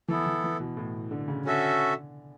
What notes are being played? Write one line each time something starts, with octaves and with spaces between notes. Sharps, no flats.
E3 B3 E4 A4
E3
E3
B2
A2
D3
C#3
D3 C#4 F#4 A4 E5